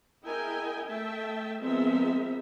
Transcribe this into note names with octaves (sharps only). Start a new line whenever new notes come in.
E4 G#4 A#4 D#5 G5 G#5
A3 E5 G5 A5
F3 G#3 B3 C4 A#4 E5